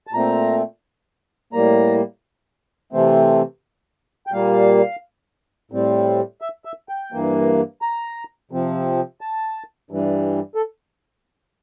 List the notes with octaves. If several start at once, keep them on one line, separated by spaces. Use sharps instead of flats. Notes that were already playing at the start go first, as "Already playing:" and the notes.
A5
A#2 A3 C4 A#5
A2 G3 A#3 A#5
C3 E3 A3 C4
G5
A#2 G3 A#3 F5
A2 G3 C4
E5
E5
G5
G2 E3 A#3
A#5
C3 F3 C4
A5
G2 E3 G3
A4